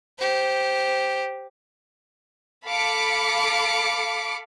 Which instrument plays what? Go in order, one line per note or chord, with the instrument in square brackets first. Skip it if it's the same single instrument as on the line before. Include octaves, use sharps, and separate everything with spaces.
[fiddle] G4 C5
[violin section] A4 F5 B5 D6 C#7 D7